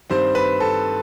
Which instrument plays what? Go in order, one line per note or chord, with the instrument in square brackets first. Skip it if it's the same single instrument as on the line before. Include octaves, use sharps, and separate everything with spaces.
[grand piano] G2 D#3 G3 C4 C5
B4
A4